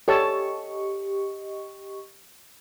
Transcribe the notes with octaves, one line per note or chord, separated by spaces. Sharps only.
G4 A4 C#5 D#5 A5 C#6